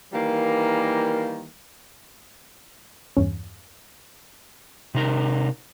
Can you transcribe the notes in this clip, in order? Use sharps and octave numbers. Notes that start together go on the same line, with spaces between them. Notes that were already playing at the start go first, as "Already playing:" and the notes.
D#3 E3 G3 A#3
E2 G2 C#4
C3 D#4 A#4